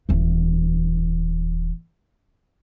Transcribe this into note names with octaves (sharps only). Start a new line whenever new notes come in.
D#1 E3